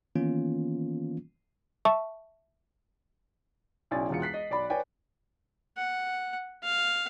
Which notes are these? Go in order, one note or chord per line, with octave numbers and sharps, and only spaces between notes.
D#3 E3 A#3 B3 C#4 F4
E5 A5 C#6
B1 C#3 E4 D5 G#5 A6
E1 E2 F4 C#7
F#6 B6 C7
D#5
B1 D5 B5
B4 C#5 D5 G5 G#5
F#5
F5